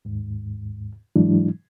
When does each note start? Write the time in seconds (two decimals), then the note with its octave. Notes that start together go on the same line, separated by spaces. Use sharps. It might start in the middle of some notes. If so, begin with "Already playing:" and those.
0.05 D#2 G#2
1.16 G#2 E3 F#3 G#3 D4 E4